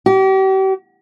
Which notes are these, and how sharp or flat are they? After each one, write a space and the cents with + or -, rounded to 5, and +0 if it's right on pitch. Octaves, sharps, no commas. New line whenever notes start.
G4 -40